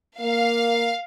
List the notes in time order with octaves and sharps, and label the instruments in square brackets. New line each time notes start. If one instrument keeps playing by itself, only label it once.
[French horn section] A#3 [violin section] F5